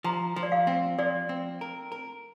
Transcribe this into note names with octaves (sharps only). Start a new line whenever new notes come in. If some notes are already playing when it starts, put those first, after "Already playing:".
F3 A#5
F3
D5
F5
C4
F3 D5
C4
A#4
A#4